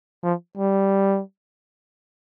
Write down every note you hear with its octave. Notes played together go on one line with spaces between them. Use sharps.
F3
G3